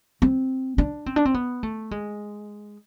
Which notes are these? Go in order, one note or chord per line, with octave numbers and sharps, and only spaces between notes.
C4
D4
C4
D4
C4
B3
A3
G#3